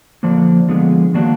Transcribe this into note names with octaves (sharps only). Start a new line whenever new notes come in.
D3 F3 A#3 D4
D3 F3 G#3 B3
D#3 F#3 A#3 D4 F#4